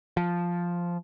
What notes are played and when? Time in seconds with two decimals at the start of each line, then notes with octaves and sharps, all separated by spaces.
0.17 F3